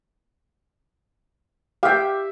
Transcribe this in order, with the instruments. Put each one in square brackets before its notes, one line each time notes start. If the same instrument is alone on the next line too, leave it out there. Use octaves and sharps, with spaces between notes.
[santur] G4 E5 [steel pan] F5 G5